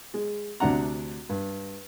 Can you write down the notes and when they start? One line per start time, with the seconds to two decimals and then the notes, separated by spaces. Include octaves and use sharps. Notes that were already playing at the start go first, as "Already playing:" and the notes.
0.14 G#3
0.60 D2 C3 D4 F#5 A#5
1.29 G2